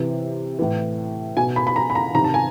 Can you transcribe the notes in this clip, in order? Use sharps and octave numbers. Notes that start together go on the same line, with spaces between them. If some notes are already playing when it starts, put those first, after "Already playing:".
Already playing: C3 E3
A2 E3
B2 G#5
B5
B5
A#5
B5
A#5
C3 D#3 A#5
A5
G#5